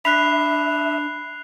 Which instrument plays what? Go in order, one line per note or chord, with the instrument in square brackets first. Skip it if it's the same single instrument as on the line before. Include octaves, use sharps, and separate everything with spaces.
[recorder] D4 [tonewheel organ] E5 [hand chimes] B5 [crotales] F#6 C7 F7